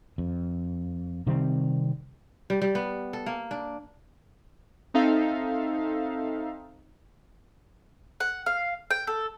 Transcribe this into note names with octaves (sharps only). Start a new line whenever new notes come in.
F2
C3 D#3 G3 C4
G3
G3
B3
A4
A#3
D4
C4 D#4 A4 E5 F5
F#5
F5
G5
A4